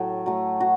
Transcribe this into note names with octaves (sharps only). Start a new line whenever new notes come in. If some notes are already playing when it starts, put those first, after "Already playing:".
Already playing: A2 F#3 A3
F#3 A3
F#4